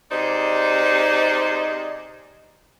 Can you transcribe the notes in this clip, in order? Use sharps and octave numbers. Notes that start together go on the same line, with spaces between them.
C3 D#4 G#4 C5 D5 D#5